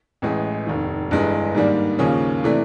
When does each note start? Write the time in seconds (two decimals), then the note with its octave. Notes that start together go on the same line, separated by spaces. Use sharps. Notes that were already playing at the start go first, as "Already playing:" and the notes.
0.22 A1 A2 E3 G#3
0.66 F1 D#2 D#3
1.11 G1 G2 E3 G#3
1.55 G#2 D#3 G3 A#3 D4
1.99 D#2 C#3 F3 A#3 C#4
2.44 C3 E3 A3 D4